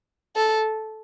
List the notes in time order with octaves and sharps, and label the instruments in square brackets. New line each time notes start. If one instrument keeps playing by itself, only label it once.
[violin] A4